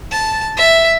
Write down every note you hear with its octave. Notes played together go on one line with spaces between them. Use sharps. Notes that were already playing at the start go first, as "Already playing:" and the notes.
A5
E5